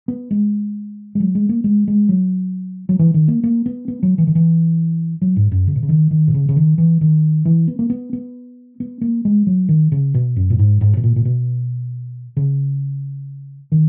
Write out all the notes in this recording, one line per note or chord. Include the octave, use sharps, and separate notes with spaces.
B3
G#3
G#3
F#3
G#3
A#3
G#3
G#3
F#3
F#3
E3
D#3
A#3
A#3
B3
B3
F#3
E3
D#3
E3
F#3
G#2
F#2
C#3
B2
C#3
D#3
D#3
B2
C#3
C#3
D#3
E3
D#3
E3
B3
A#3
B3
B3
B3
A#3
G#3
F#3
D#3
C#3
B2
F#2
A#2
G#2
G#2
B2
A#2
A#2
B2
C#3
D#3